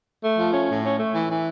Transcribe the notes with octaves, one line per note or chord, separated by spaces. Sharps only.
A3
F3
C#4
A2
C#4
A3
E3
E3